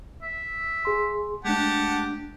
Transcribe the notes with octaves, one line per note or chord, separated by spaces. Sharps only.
E5
G#4 C6
G#3 A3 D4 G4 F#5 A5